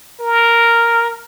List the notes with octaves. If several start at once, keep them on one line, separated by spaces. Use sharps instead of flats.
A#4